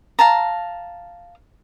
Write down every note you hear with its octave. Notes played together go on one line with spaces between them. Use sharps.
F5 A5 A#5